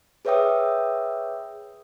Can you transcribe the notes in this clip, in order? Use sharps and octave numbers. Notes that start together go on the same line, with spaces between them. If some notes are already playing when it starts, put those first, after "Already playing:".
G#4 B4 C#5 E5 G5 D#6